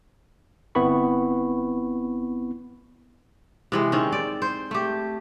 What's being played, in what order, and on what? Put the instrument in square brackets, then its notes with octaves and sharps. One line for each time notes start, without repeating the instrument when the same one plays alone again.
[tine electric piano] G1 B3 C4 E4 B5 C#6
[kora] C3 E3 G#3
D#3 C4 C#4
D5
C5
A3 G4